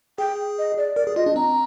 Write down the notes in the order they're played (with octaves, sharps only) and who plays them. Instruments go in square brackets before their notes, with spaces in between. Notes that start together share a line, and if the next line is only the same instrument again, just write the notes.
[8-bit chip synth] G#4 [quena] G5
[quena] D#5
D5
[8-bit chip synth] A#4 [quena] D5
[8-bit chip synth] G#4
[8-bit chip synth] F4 [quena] D#5
[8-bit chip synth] D4
[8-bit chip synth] C4 [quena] A#5